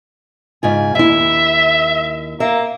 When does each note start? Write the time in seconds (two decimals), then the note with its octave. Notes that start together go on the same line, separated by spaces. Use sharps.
0.63 G#2 C#3 F4 G#5
0.95 D#2 E4 E5
2.40 A#3 E5